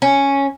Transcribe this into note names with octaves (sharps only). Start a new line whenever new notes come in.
C#4